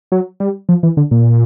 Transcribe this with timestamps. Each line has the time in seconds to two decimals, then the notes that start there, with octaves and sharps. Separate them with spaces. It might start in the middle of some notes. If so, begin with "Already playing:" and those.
0.12 F#3
0.40 G3
0.69 F3
0.83 E3
0.97 D3
1.11 A#2